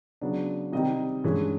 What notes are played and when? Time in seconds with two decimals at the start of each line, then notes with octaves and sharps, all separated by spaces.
0.21 C#3 F#3 B3 D4
0.72 C3 D#3 G3 D#5
1.24 G2 E3 G#3 C#4